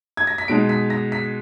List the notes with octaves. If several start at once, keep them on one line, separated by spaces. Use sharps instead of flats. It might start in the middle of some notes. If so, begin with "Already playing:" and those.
G#6
A#6
B6
B2 G#3 D#4 D7
B6
A#6
B6